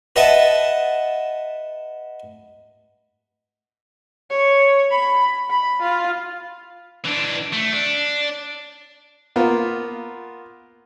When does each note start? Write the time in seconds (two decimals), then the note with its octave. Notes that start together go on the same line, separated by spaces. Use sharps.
0.16 B4 D#5 E5 F#5 A5
4.30 C#5
4.91 B5
5.50 B5
5.82 F4
7.05 E3 D4
7.53 A3
7.73 D4
9.36 A#3 B3 F4